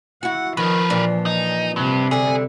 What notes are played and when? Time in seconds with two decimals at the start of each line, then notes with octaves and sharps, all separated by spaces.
0.23 E4 F#4 F#5
0.57 D#3 F3 A#4 B4
0.90 A#2 E3 D4
1.26 D#4
1.76 G2 C3
2.11 D3 G3 G#4